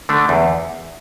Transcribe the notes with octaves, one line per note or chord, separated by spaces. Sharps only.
D3 A3 D4
E2